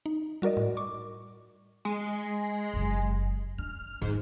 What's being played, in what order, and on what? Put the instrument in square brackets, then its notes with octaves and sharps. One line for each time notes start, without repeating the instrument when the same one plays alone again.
[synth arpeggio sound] D#4
G3 F#4 A#4 D5 D#5
A2
C#6 D6
[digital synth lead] G#3
[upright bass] F#1 C3
[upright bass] D4 [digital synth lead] F6
[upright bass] F2 D#3 [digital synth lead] G#2